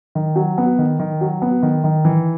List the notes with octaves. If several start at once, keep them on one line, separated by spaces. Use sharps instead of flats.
D#3
F#3
B3
D#3
D#3
F#3
B3
D#3
D#3
E3